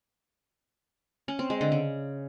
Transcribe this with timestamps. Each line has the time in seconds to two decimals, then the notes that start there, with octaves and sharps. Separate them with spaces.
1.28 C#4
1.39 C4
1.50 G#3
1.61 D3
1.72 C#3